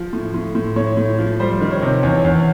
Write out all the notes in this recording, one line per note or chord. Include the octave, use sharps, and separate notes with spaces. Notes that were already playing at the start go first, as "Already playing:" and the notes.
Already playing: F3
A2
A2
A2
A2 C#5
A2
F3
G3 C5
D#3
C#5
C3
E2 C#5
E2 C#5